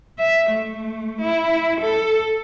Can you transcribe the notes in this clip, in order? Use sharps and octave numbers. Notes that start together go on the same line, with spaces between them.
E5
A3
E4
A4